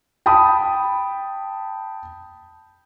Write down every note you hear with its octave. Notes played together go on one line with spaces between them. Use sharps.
G5 A5 B5 D#6